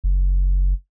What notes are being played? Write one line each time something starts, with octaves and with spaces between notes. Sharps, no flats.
F#1